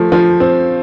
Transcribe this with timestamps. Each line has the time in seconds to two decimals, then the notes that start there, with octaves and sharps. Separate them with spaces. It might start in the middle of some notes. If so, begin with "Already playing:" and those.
Already playing: F3 A3
0.12 F3
0.40 C4